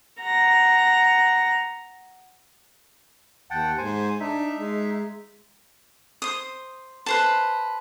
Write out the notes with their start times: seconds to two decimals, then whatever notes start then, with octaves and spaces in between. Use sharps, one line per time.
0.20 F#5 A#5
3.50 D#2 F#5 G5 A5
3.78 G#2 C5 G#5
4.20 D4 D#4 E5
4.56 G#3
6.22 C5 D#6
7.06 B4 C5 A5